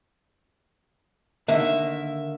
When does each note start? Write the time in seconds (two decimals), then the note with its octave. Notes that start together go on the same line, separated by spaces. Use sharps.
1.48 D3 D#3 A#3 E5